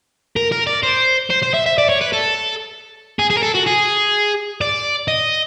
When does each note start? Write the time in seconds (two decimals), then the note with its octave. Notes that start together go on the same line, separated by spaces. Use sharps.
0.36 A#4
0.52 A#4
0.67 D5
0.83 C5
1.30 C5
1.42 C5
1.54 E5
1.66 E5
1.78 D5
1.89 C#5
2.01 B4
2.13 A4
3.19 G#4
3.30 G#4
3.37 A#4
3.43 A4
3.55 F#4
3.67 G#4
4.61 D5
5.08 D#5